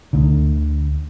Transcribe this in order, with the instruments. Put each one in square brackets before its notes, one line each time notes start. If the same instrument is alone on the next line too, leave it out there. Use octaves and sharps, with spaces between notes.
[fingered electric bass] D2 D3